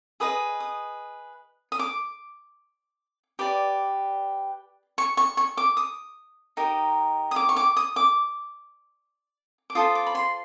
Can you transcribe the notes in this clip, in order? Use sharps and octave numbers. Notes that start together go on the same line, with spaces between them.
G#4 B4 D#5 D#6
D#6
D#6
D6
G4 B4 D5 D6
C#6
C#6
C#6
D6
D#6
D#4 G4 A#4 D#5
D#6
D6
C#6
D6
D#6
D6
D6
F4 A4 C5 D#6
D6
B5
C6